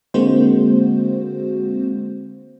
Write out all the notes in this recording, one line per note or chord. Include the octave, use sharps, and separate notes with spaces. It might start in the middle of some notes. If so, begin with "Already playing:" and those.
D3 G#3 A#3 C4 F#4 C5